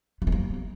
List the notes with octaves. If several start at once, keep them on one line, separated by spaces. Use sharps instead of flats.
B3
G#3
A#3